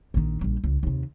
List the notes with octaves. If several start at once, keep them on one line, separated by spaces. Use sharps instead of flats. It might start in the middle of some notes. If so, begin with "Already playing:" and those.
A#1 D#3
A#1 G3
C#2
D#2 C3